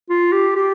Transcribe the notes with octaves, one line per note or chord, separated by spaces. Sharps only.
F4
G4
G4